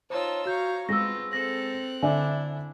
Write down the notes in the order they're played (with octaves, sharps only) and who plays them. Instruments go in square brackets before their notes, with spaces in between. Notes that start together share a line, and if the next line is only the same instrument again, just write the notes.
[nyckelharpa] D#4 F4 [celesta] C5 C#5 [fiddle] A5 E6
[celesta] F#4 G6 [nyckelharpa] C#5 F5 [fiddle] A#5
[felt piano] G#3 G#4 [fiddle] B3 F4 [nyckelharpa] C4 [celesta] E6 A#6
[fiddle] C4 F#6 [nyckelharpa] A4 [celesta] A#6
[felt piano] D3 D5 E5 [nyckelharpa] D4 E4 [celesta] G#5